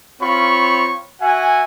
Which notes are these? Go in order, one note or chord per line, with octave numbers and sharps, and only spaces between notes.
C4 F4 C#5 B5 C#6
F#4 E5 F#5 G#5